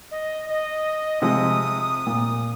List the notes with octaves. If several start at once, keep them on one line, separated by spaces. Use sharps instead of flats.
D#5
D#5
C3 F3 G#3 D#6
A#2